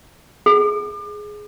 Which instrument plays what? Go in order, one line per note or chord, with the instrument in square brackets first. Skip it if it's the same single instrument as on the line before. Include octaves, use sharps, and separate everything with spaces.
[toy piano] G#4